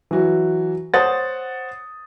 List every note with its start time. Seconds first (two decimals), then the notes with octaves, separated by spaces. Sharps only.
0.11 E3 F#3 F#4
0.94 C5 C#5 F#5 D#6 A6